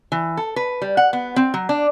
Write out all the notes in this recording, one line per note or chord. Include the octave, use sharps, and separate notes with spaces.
E3
A4
B4
G3
F#5
B3
C4
F#3
D4